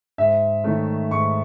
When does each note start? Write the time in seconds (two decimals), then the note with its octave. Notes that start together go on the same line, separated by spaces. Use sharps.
0.18 G#2 E5
0.64 D#3 A3 C#4
1.11 G#2 C#6